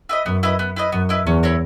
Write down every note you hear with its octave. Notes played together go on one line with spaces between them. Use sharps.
E4 B4 D#5
F#2 B3
E4 B4 D#5
B3
E4 B4 D#5
F#2 B3
E4 B4 D#5
E2 C#4
E4 A#4 C#5